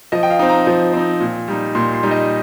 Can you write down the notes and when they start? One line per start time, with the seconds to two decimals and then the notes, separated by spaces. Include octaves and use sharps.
0.12 F3 D#5
0.23 G5
0.30 F5
0.39 C4 D#4
0.49 A#5
0.67 F3
0.93 C4 D#4
1.21 A#2
1.48 G3 D#4
1.75 A#2 C6
1.94 C6
2.03 G3 D#4
2.11 D#5